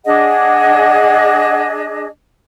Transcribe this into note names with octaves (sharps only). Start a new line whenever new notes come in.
D4 G#4 D#5 F#5